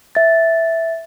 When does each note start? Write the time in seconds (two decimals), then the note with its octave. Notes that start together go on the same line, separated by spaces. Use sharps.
0.15 E5 A6